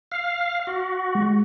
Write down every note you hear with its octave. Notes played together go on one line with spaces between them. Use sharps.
F5
F#4
G#3